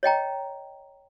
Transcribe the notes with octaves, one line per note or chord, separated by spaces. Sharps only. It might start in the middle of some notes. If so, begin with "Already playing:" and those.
C#5 D#5 G5 A#5